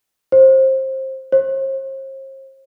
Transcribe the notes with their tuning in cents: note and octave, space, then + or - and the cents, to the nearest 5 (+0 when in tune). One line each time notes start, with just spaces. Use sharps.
C5 +20
C5 +40